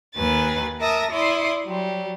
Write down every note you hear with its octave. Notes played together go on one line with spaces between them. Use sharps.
D#2 D#3 B4 G#5 A6
A#4 E5 A5 D#6 A#6
E4 D5 C6 D#6
F#3 G3